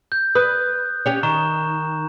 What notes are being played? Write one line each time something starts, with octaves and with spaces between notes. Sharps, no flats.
G6
B4 D#6 F#6
C#4 G4 C#5
D#3 A#5 C#6 E7